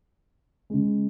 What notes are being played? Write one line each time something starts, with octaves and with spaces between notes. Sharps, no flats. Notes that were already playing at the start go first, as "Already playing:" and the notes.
C#3 G#3